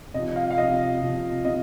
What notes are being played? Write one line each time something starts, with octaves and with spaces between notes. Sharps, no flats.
C3 F3 D#5
F5
F5
C3 F3 D#5
C3 F3
C3 D#5